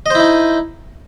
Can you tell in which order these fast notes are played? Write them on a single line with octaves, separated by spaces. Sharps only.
D#5 C5 E4 D#4